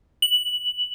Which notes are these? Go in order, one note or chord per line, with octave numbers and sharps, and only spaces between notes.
F#7